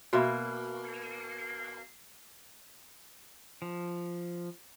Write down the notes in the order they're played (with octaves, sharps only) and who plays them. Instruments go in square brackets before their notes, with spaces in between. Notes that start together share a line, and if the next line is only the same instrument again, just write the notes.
[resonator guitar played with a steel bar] B2 A#3 [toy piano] F#4 E5 B5
[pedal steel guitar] F3